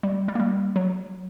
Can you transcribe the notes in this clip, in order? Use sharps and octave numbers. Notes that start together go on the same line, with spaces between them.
G3
G3
A#3
G3
F#3